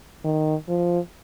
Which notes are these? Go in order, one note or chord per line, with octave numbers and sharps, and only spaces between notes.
D#3
F3